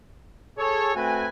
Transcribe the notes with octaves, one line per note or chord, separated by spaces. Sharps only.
G#4 A4 C#5
A3 C4 F#4 B4 G#5